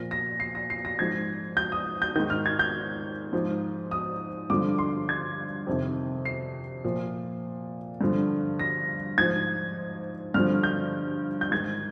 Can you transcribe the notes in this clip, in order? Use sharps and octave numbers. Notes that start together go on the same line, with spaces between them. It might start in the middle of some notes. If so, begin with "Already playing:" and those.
Already playing: A#2 F3 A#6
A#6
C7
A#6
C7
A#6
G#2 F3 G#6
G6
D#6
G6
G#2 D#3 G6
F6
G#6
G6
G#2 F3
D#6
G2 D3 F3 D6
C6
G#6
F2 C3 D#3
C7
A#2 F3
G2 D3 F3
A#6
G#2 F3 G#6
G2 D3 F3 F6
G6
G6
G#2 D#3 G#6